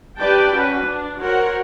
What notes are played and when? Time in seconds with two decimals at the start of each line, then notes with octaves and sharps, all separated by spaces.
0.19 D4 G4 B4 D5 G5 A5
0.52 C#4 F#4 B4
0.83 D4
1.20 F#4 A#4 C5 C#5 F#5